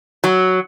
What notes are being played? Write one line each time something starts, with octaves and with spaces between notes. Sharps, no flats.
F#3